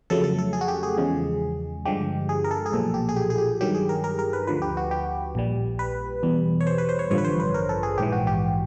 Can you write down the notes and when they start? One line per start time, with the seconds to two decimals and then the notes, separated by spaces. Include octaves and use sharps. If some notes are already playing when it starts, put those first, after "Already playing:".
0.10 F2 C#3 F#3 A3 A4
0.24 A4
0.38 A4
0.53 G#4
0.61 F#4
0.68 G4
0.83 G#4
0.97 E2 C#3 F3 G#3
1.85 G2 D3 F3 G#3 G4
2.29 G#4
2.44 A#4
2.51 A4
2.66 G#4
2.72 B1 A#2 F3 A4
2.94 G4
3.09 G#4
3.16 G4
3.30 G#4
3.38 G4
3.61 G2 D#3 F#3 G4
3.75 G#4
3.89 A#4
4.04 A#4
4.19 A#4
4.33 B4
4.47 D2 D3 F3 B4
4.62 G4
4.77 F#4
4.91 G4
5.35 A#1 A#2 G3
5.79 B4
6.23 E2 B2 G3
6.61 C#5
6.67 C5
6.78 B4
6.89 C5
6.99 C#5
7.11 A1 G2 D3 F3 C#5
7.18 B4
7.25 C5
7.40 B4
7.54 A#4
7.69 A4
7.83 G#4
7.98 A#1 G#2 E3 G4
8.13 F#4
8.27 G4